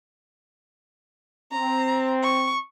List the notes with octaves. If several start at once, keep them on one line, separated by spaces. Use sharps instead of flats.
C4 A#5
C#6